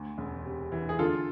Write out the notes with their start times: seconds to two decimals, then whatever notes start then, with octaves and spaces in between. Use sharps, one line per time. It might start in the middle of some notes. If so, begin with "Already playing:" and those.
Already playing: D2
0.18 E1
0.45 C3
0.72 E3
0.89 G#4
0.99 D3 F4 A4